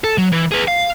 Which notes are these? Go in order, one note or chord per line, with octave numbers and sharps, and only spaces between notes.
A4
F#3
E3
G#4 B4
F5